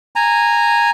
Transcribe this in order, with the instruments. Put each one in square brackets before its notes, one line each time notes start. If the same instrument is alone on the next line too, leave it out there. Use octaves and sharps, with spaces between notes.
[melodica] G#5 A#5